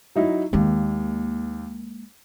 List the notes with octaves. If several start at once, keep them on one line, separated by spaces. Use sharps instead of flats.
F#3 D#4 E4
D#2 G#3 A#3